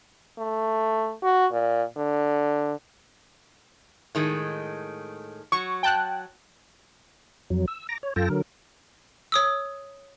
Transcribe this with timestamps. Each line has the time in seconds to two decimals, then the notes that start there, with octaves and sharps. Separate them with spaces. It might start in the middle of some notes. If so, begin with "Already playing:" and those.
0.39 A3
1.23 F#4
1.52 A#2
1.97 D3
4.15 A2 D#3 G#3
5.52 F#3 C#6
5.83 G5 A5 F#6
7.50 F2 F#3
7.68 E6
7.89 A#5 D6 A#6
8.03 C#5
8.16 F#2 F4 A4 G5 A5 A#6
8.30 D3 F#3 A#4
9.32 C#5 D#6 E6